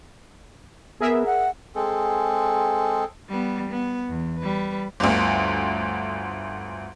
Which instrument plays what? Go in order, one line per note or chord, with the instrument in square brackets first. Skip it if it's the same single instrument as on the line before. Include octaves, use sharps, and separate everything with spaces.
[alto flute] B3 [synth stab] G#4 A#4 E5
[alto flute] F#5
[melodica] G#3 C4 G#4 A4
[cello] G3 B3
B3
E2
G3 B4
[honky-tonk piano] G1 D2